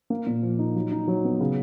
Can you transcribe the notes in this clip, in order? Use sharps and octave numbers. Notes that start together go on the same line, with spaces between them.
A#3
A#2
F3
D#4
F#3
D#4
F#3
B3
C#3